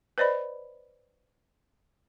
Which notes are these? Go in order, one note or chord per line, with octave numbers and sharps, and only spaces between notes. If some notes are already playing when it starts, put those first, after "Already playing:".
B4 C5 D5 D#5 B5